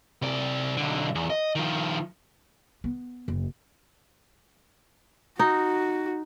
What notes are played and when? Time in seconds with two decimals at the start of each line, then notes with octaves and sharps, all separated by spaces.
0.22 C3 D5
0.77 B1 D3
1.15 E2
1.30 D#5
1.55 D#3 F3
2.84 B3
3.28 F#1
5.39 D#4 F#4